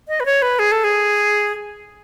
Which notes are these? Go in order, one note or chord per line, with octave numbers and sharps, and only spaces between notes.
D#5
B4
C#5
B4
G#4
A4
G#4